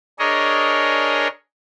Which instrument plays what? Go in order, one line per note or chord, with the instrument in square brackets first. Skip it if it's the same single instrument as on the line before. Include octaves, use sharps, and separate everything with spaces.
[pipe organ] D4 G#4 A#4 C#5 D#5